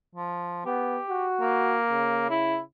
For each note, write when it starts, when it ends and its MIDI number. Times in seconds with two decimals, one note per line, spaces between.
0.15 0.61 53
0.65 0.98 59
0.65 1.25 67
1.08 1.79 66
1.41 2.30 58
1.90 2.62 49
2.30 2.58 64